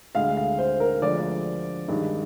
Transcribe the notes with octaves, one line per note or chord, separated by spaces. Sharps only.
D2 D3 G#3 F5
F5
C5
A#4
D2 D3 F3 G#3 D5
G2 D#3 G#3